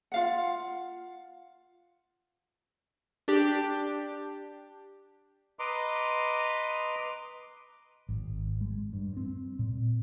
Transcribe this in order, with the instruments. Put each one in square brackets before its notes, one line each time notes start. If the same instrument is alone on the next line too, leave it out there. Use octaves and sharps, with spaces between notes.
[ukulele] F4 F5 F#5
[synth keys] D4 G4
[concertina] B4 D#5 A#5 C6 D6
[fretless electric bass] G#1
G#3
G2
C4
A#2